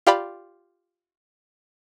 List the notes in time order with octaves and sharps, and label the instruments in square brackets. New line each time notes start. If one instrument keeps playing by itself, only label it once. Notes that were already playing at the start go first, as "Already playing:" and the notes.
[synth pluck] F4 G4 D5 B5